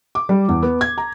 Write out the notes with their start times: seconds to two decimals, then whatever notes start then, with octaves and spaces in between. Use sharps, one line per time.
0.15 D6
0.29 G3
0.49 E2
0.63 B3
0.81 G#6
0.98 A#5